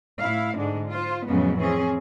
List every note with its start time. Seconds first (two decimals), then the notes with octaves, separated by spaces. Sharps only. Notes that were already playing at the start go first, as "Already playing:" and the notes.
0.19 A2 E4 F5
0.57 G#2 D3 G#3 D4
0.89 F4 C5
1.27 F2 A2 C#3 F#3 G#3 B3
1.58 E3 C4 C#4 G#4